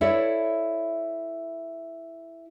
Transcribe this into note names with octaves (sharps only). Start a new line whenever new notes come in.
E4 A4 C#5 D5 E5